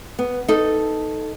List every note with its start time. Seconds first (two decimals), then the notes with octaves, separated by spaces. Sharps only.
0.19 B3
0.48 D#4 A4